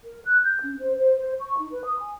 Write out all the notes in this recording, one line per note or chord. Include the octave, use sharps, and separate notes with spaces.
A#4
F#6
G6
C#4
C5
C5
C5
C#6
D#4
B4
D#6
G#5